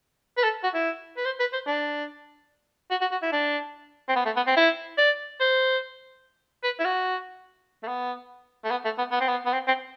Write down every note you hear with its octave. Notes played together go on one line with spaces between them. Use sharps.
B4
A4
F#4
E4
B4
C5
B4
C5
D4
F#4
F#4
F#4
E4
D4
C4
B3
A3
B3
C4
E4
D5
C5
B4
E4
F#4
A3
B3
A3
B3
A3
B3
B3
C4
B3
B3
C4
C4